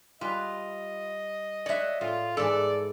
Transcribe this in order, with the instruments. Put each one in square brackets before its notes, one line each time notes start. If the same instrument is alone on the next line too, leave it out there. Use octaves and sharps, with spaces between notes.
[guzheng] G3 B4 [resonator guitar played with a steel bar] F4 [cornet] D#5
[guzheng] C#5 F#5 [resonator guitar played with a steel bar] D5 E5
[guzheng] A2 [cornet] F4
[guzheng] G#2 E3 [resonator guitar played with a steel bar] A4 [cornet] D5